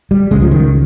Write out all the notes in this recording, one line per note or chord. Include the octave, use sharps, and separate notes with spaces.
G3
C#2 C#3 G#3
F3
D#3